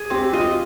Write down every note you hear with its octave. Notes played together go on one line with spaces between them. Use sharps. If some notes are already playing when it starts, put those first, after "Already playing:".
Already playing: G#4
C4 G4
F4 D#5